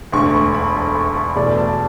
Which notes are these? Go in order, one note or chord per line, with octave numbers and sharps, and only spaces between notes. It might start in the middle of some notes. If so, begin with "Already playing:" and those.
E1 D2 D3 A3 C#6
B5
B5
B5
C#6
B5
E1 E2 B2 A3 D5
A5